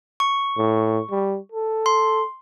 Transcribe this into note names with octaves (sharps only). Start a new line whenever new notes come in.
C#6
A2
G3
A4
C6